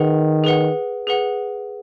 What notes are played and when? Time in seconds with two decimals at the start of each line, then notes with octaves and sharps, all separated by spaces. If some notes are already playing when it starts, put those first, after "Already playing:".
Already playing: D#3 G#4 B4 F#5
0.44 G#4 B4 F#5
1.07 G#4 B4 F#5